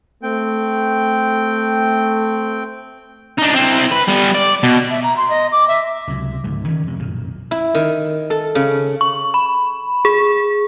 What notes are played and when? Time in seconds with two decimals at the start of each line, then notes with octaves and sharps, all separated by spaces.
0.23 A3 C4 G5
3.38 D4 D#4
3.55 C4 E4
3.91 B4
4.08 G3 B3
4.34 D5
4.63 B2
4.90 E5
5.03 A#5
5.17 C6
5.30 D#5
5.52 D6
5.68 E5
6.07 C#2 C3 F#3
6.44 C#2 G#2 D3
6.68 D#3 C#4
6.87 F2 C3
6.99 B1 F#2 A#2
7.51 E4
7.75 D#3
8.30 A4
8.55 C#3
9.01 C#6
9.34 B5
10.05 G#4